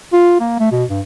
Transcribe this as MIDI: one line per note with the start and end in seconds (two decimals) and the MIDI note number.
0.13 0.36 65
0.40 0.56 58
0.60 0.67 57
0.72 0.84 47
0.90 1.01 43